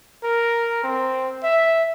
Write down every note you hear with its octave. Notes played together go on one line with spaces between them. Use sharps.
A#4
C4
E5